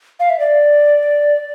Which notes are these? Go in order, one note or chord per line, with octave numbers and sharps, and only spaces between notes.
F5
E5
D5